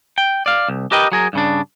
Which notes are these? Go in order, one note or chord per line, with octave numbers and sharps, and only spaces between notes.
G5
D5 F5
C2
G4 A#4 B4 D#5 G5
F#3 G#4 A#4
G2 C#3 D4